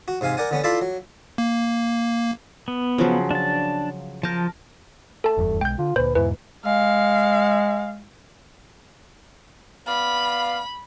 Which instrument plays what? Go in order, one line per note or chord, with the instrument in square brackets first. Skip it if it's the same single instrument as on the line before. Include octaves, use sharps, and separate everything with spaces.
[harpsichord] F#4
G#2 C3 F5 G#5
A#4 D5 F#5 G#5
D3 B3 C#4
E4 F4 A4 D5 B5 C6
F#3
[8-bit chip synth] A#3
[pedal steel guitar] B3
[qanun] C#3 F3 F#3
[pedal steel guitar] D4 A5
[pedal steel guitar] F3 G6 [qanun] A#4 A5
[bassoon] A3 [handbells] A4 A5
[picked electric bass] F1 E2 G2
[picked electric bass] B1 G#3 [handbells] G5 G6
[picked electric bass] D3 [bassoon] F4
[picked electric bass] D2 A#2 [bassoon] B4 [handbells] C5
[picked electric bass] E2 G#2 B2 [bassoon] E3 [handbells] B4
[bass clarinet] G#3 [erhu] F5
[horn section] B3 D5 F5 [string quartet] B5